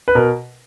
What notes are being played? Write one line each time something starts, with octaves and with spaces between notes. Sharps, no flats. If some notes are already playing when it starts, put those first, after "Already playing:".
B4
B2 A#4